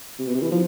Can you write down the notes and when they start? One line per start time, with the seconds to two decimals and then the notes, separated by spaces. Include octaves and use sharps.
0.19 C3
0.27 B2
0.34 C3
0.42 E3
0.52 F3